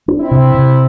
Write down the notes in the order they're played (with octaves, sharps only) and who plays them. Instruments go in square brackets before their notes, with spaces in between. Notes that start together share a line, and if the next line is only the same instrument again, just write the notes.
[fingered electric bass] D4
[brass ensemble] C4 E4
[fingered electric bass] C3
C3